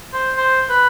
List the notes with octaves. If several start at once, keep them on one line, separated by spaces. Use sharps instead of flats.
C5
C5
B4